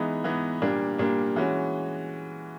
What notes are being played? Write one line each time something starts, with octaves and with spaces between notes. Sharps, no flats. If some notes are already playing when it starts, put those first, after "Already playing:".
Already playing: E3 G#3 B3 D#4
E3 G#3 B3 D#4
A#2 G3 A#3 D4
A#2 G3 A#3 D4
E3 G#3 C#4 F#4